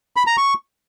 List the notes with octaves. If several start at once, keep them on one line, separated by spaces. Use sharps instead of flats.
B5
A#5
C#6